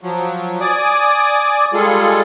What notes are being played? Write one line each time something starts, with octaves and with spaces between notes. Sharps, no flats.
F3 F#3
D5 G#5 D6 D#6
G3 G#3 F4 G#4 A4